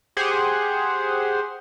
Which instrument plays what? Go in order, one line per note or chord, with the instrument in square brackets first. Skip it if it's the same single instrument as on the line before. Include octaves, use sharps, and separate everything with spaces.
[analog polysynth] G4 G#4 C5 F#5